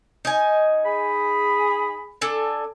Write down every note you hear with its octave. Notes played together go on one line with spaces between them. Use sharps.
D#4 G#5
G#4 B5
D4 A4 G#5